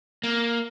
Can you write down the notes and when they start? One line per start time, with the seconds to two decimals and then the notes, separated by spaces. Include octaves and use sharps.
0.23 A#3